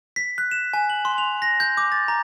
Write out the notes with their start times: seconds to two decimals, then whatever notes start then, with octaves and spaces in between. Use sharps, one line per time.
0.16 B6
0.38 F#6
0.51 E7
0.73 G#5
0.90 F#7
1.05 C6
1.18 F7
1.42 A#6
1.60 G6
1.77 D6
1.92 A6
2.08 A#5